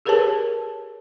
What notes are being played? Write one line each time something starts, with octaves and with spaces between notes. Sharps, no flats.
G4 G#4 A#4 B4 C#5 A5